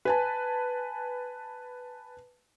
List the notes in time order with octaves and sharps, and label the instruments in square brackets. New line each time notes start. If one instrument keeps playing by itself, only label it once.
[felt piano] B4 G#5 A5